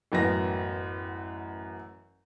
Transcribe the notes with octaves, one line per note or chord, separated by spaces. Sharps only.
A1 F#2 B3 A#6